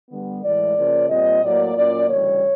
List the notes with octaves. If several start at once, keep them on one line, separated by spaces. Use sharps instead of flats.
D3 G3 B3
A2 E3 G#3 D5
C#3 F3 A#3 C#4
A#2 G3 C4 D#5
A2 F#3 A#3 D5
A#2 F#3 A#3 C#4 D5
D2 C#3 E3 G3 C#5